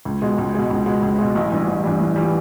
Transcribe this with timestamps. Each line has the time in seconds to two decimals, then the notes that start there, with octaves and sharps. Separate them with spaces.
0.05 C#2
0.22 B2 G#3
0.38 C#2
0.55 B2 G#3
0.71 C#2
0.86 B2 G#3
1.02 C#2
1.19 B2 G#3
1.35 A1
1.51 G2 E3 G3
1.68 A1
1.83 G2 E3 G3
2.00 A1
2.16 E3 G3